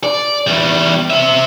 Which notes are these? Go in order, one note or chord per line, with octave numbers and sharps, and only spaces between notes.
D5
E2 G3
C4 E5